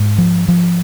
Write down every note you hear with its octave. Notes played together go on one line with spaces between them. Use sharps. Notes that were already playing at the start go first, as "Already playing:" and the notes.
Already playing: G#2
F3
F3